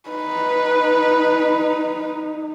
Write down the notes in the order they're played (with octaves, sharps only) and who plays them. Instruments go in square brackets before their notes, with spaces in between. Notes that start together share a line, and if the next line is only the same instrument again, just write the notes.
[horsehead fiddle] D#4 [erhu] B4